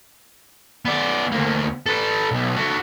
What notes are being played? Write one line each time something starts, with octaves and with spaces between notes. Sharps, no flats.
B3 D5
D2 A#3
A4 B4
B1
F#4 A4